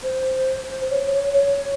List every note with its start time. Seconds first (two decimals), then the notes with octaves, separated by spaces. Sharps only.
0.03 C5
0.90 C#5
1.12 C#5
1.33 C#5